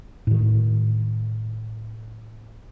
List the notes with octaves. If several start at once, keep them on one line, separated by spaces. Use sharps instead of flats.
A2 D#3